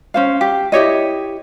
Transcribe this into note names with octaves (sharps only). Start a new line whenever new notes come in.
C#4 C5 F5
G4
E4 G4 C#5 D#5